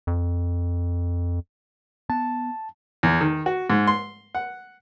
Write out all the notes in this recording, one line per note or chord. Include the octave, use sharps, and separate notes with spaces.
F2
B3 A5
E2
D#3
F#4
G#2
C6
F#5